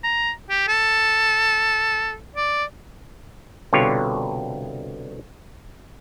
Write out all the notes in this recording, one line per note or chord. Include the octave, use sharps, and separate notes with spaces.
A#5
G4
A4
D5
C2 B2 D3 F4 G4 C#5